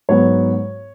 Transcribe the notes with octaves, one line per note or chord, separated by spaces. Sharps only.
G#2 F#3 B3 C#5